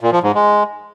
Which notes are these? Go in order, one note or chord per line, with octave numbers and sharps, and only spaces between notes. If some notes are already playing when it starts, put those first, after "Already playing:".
A#2
F3
G#2
G#3